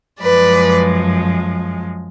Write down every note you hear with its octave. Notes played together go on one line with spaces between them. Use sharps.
F#2 F3 G#3 B4 D5